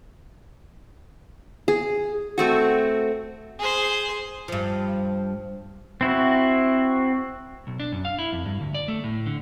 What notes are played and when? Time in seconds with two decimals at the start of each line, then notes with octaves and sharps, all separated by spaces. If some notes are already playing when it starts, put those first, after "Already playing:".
1.68 G#4
2.38 A3 C4 F#4
3.59 G#4 C5
4.48 G2 F3
6.01 C4 E4 F#4
7.67 B1
7.80 D4
7.92 F#2
8.05 F5
8.19 E4
8.33 F2
8.46 G2
8.60 D2
8.75 D5
8.88 A3
9.04 A2
9.26 D3